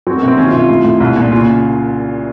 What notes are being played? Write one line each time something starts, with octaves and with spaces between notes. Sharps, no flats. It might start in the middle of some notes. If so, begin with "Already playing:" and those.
F#3 C4
A#3
C3 C4
D#3 C#4
F4
C3
F4
A2
A2
C2
A#2
C#3 F4